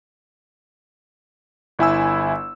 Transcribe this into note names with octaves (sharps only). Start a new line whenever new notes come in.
G1 E4 G#5 E6